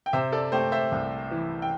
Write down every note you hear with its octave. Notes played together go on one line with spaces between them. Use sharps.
G5
C3 C5 E5
A4 D5
A3 G4 C5
C5 E5
C2
E3
G5